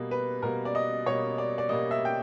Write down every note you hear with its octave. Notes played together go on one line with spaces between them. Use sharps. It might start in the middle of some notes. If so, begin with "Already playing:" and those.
Already playing: B2 G3 A#3
B4
B2 G3 A#3 A#4
D5
D#5
B2 G3 A#3 C#5
D5
D5
B2 G3 A#3 D#5
E5
G5